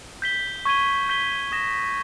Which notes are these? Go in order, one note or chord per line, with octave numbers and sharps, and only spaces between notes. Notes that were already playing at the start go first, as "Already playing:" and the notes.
G6 B6 G7
C#6 G#6 D#7 G7
G6 B6 G7
D#6 A#6 E7